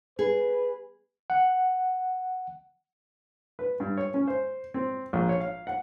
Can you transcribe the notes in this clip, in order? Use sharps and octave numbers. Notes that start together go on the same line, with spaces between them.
G#4 B4
F#5
B4
G2
C#5
C#4
C5
C4
A#1
C#5
F5
F#5